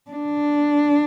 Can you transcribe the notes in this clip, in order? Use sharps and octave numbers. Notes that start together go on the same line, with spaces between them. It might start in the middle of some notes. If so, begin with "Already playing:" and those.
D4